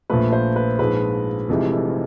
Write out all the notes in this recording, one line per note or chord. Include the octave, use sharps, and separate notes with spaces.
A#1 A#2 F3 A3 B4
C5
B4
A#1 G#2 F3 G#3 B4
F1 F2 C3 E3 G#3